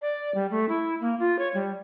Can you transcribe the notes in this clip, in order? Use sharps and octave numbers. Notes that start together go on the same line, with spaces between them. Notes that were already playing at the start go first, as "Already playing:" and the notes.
D5
G3
A3
E4
A#3
F4
C#5
G3